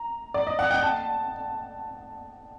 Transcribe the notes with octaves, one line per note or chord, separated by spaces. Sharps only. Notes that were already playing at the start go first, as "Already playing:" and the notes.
Already playing: A#5
D5
D#5
F#5
G5
A5